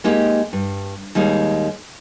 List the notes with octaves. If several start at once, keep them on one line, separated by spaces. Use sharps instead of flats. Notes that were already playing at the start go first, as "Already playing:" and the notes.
G#3 A#3 D#4 G4
G2
D#2 G3 G#3 D#4